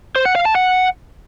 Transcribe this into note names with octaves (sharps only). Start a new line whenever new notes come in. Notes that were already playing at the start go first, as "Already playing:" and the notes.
C5
F#5
F5
A5
F#5